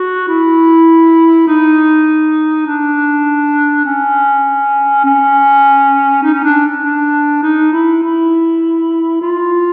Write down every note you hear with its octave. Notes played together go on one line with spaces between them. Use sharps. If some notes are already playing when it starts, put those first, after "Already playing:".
Already playing: F#4
E4
D#4
D4
C#4
C#4
D#4
C#4
D4
D4
D#4
E4
E4
F4